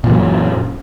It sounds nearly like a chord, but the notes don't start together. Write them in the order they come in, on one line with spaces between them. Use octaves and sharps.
A#2 E3 F#3 F#2